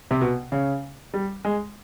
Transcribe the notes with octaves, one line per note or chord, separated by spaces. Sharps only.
C3
B2
C#3
G3
G#3